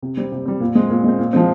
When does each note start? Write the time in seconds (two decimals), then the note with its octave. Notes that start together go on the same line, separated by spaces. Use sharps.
0.02 C3
0.17 G3 C4
0.32 C3
0.46 G3 C4
0.60 A#2
0.75 G#3 C4
0.90 A#2
1.04 G#3 C4
1.19 A#2
1.33 F3 G#3 C4